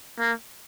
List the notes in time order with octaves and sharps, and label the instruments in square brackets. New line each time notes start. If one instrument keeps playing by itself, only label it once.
[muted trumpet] A#3